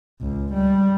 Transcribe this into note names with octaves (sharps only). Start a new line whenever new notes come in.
C#2
G3